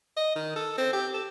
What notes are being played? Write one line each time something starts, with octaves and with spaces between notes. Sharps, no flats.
D#5
D#3
A4
C4
G4
A4